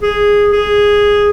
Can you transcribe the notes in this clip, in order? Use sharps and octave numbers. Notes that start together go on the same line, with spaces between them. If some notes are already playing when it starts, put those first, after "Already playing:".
G#4
G#4